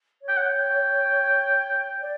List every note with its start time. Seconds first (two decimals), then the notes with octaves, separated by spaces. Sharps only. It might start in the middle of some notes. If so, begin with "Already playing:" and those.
0.22 C#5
0.28 G5
0.36 F#5
0.42 G5
2.01 D5